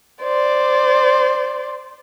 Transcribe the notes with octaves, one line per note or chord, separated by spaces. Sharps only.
C5 D5